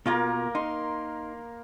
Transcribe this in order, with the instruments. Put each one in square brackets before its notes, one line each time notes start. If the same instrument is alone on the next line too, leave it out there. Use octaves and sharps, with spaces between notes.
[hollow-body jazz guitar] B2 F4 [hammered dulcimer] A#3 A#4
[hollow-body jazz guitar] D#4 [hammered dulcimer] C6